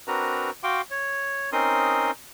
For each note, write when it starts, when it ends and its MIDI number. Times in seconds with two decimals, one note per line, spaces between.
0.08 0.51 60
0.08 0.51 62
0.08 0.51 66
0.08 0.51 70
0.08 0.51 71
0.08 0.51 82
0.64 0.81 66
0.64 0.81 77
0.64 0.81 79
0.64 0.81 84
0.64 0.81 86
0.91 1.50 73
1.53 2.11 60
1.53 2.11 61
1.53 2.11 63
1.53 2.11 70
1.53 2.11 84
1.53 2.11 87